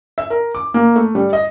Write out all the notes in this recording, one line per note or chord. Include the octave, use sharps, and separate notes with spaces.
E5
A#4
D6
A#3
A3
G3
D#5